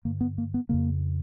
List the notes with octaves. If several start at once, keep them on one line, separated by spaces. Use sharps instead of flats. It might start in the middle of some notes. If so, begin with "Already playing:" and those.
G2 D3 A#3
B3
A#3
B3
F2 C#3 A#3